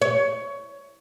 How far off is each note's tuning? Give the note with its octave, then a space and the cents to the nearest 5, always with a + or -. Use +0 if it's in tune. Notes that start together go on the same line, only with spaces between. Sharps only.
C#5 +15